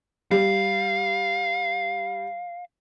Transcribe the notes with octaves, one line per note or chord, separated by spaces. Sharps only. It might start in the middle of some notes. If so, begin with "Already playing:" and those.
G3 F5